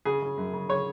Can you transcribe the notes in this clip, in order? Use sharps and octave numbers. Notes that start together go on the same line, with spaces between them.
C#3 G#4
C#3
F#2
C#3
C#3 C#5